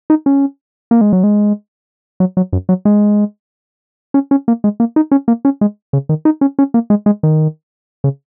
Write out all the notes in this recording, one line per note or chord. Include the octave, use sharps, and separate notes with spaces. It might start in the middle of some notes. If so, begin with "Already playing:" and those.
D#4
C#4
A#3
G#3
F#3
G#3
F#3
F#3
F#2
F#3
G#3
C#4
C#4
A#3
G#3
A#3
D#4
C#4
A#3
C#4
G#3
C#3
D#3
D#4
C#4
C#4
A#3
G#3
G#3
D#3
C#3